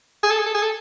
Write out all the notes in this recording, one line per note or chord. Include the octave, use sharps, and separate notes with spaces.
G#4
A4
G#4
A4
G#4
A4